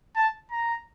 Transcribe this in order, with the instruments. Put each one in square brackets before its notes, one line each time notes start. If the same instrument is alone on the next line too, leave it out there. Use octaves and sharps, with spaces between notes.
[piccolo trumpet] A5
A#5